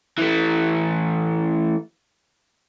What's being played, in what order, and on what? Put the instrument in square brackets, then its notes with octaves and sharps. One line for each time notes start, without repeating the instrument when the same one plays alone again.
[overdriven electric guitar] E3 A3